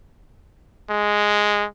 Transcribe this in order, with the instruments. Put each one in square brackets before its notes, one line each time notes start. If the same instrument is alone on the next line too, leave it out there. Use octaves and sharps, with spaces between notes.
[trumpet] G#3